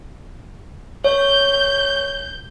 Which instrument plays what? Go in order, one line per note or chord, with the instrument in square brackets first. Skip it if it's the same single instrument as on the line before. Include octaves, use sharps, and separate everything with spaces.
[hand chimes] C#5 [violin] G6